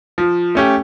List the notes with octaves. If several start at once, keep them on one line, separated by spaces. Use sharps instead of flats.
F3
A3 C#4 G4